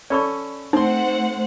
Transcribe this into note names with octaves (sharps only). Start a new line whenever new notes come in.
C#4 A4 D5 B5 C#6
A3 C4 D#4 C5 F#5 C6